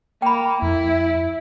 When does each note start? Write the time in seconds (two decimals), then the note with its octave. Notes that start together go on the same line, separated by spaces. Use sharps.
0.22 A#3 G5 B5
0.62 F2 E4